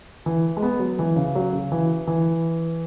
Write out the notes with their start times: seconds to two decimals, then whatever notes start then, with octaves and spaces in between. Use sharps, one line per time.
0.26 E3
0.57 G#3
0.62 B3
0.80 F#3
0.99 E3
1.16 C#3
1.35 F#3
1.53 C#3
1.72 E3
2.07 E3